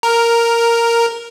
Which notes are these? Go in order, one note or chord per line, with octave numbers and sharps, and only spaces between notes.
A#4